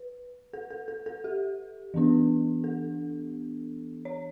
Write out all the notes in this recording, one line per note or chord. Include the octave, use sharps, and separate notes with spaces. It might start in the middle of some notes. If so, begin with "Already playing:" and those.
Already playing: B4
A4
A4
A4
A4
G4
E3 B3 D4
A4
C#5